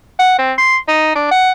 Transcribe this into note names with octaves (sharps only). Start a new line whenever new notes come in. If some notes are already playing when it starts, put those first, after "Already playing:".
F#5
C4
C6
D#4
D4
F#5